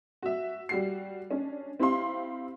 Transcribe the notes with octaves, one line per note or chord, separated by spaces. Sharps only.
F#4 E5
G3 F#4 C7
C#4 D4
C4 E4 G4 F5 C6